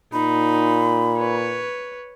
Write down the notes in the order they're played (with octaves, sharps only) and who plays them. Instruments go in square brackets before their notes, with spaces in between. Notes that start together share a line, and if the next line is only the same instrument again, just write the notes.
[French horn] A#2 [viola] D#4 [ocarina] B5
[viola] B4 C#5